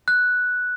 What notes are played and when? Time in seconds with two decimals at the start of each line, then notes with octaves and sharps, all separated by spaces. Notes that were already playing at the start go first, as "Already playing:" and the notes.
0.08 F#6